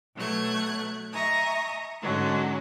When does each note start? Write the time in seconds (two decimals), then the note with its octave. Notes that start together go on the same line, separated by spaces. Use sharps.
0.14 B2 F#3 A3 F#6 G#6
1.12 D#5 E5 G#5 A#5 C#6 D#6
2.01 G#2 D3 F#3 G#3 C#4